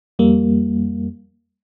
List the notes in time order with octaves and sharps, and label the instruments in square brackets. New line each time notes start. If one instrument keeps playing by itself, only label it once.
[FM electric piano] F2 G3 A#3